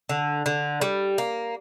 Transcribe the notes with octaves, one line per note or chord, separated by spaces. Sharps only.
D3
D3
G3
A#3